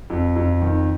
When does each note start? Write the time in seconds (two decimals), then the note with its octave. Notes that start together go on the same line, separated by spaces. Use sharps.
0.10 F2
0.36 F2
0.62 D#3